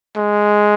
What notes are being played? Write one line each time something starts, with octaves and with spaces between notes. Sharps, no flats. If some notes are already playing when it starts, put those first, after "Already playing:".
G#3